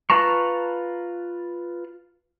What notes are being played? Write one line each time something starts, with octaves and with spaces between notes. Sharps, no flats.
F4 B4 A5 A#5 C#6